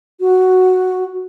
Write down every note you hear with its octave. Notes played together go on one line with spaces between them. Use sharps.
F#4